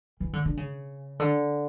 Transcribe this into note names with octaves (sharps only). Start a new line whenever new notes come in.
E3
D3
D3
C#3
D3